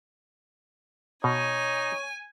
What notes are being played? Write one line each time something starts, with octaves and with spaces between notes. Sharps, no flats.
B2 D#4 C#5 G#5